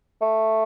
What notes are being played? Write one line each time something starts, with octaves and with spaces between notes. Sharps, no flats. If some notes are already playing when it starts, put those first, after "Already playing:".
A3